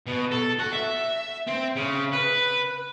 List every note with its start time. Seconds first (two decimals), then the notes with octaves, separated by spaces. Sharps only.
0.07 B2
0.32 A4
0.59 F#4
0.73 E5
1.47 C4
1.76 C#3
2.13 B4